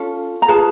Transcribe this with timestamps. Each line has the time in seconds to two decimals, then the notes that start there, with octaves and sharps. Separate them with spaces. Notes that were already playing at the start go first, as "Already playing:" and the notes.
Already playing: C#4 F4 A4
0.42 A#5
0.48 F4 G#4 B4 A5